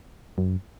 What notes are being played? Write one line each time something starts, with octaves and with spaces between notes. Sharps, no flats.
F#2